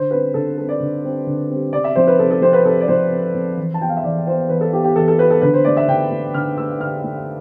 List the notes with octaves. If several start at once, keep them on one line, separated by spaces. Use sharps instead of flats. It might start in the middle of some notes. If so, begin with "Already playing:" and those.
Already playing: D3 C5
G3 C4 B4
D3 A4
G3 C4 A4
D5
D3
G3 C4
D3
G3 C4
C3 D5
E5
F3 C4 E4 C5
B4
C3 A4
A4
F3 C4 E4 C5
B4
C3 A4
D5
F3 C4 E4 C5
C3
F3 C4 E4
E3
A5
B3 F4 G5
F5
E5
E3 D5
B3 F4 C5
E3 B4
A4
B3 F4 G4
G4
E3 A4
A4
B3 F4 B4
A4
D3 B4
C5
A3 E4 D5
E5
D3 G5
A3 E4
D3 F6
A3 E4 E6
D3 F6
A3 E4